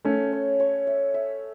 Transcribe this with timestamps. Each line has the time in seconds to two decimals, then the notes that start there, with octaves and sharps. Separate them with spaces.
0.05 A3 C#4 A4
0.32 C#5
0.60 C#5
0.87 E5
1.14 E5